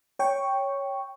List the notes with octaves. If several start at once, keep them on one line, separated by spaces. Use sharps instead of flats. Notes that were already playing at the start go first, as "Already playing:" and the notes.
C#5 G5 C#6